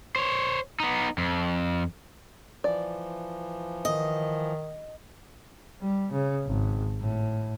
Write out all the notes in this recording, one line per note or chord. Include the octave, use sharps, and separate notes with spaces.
C5 C#5
B3 D#4
F2
E3 F3 D5
D#3 D#5
G3
C#3
G#1
A2